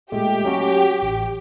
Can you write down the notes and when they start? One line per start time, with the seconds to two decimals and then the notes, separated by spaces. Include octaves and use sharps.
0.12 A#2 G#3 A3 G4
0.45 F#3 C#4 F#4
1.02 A1